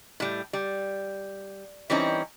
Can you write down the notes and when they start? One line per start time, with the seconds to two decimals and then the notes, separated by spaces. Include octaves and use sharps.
0.20 A2 G3
0.53 G3
1.90 E3 G3 C4 C#4 D#4